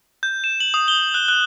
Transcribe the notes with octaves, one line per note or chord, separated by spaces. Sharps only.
G6
E7
F#7
D#6
G7
F#6
F#6